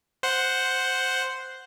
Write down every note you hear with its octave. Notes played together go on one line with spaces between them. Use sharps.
C5 F#5